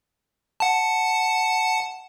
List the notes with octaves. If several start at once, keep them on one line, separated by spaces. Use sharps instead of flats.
F#5 A5